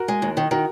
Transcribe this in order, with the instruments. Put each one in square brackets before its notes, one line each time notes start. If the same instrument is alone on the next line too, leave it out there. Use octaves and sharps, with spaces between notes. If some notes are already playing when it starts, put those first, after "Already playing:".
Already playing: [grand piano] F#4 A#4
[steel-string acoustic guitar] G#3
D#2
D#3
[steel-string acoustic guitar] D#3 [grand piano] F#4 A#4